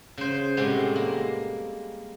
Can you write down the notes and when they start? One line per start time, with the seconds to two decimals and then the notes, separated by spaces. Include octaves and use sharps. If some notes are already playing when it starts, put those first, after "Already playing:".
0.18 C#3 C5
0.57 A2 C3 G3 G#3 B3
0.96 A#3